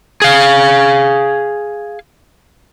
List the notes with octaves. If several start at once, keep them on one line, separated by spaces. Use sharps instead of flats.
G#4 F5